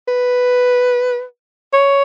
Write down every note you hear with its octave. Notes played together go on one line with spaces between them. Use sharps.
B4
C#5